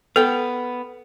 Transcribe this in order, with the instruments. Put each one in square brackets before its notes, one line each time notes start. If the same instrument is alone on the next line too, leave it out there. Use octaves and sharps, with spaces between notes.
[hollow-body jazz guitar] B3 G5 [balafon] A4